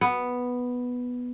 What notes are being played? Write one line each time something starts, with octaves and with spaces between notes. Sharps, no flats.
B3